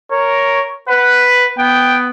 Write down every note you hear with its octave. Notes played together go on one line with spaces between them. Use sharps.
A#4 C#5
B4 F#5
B3 G5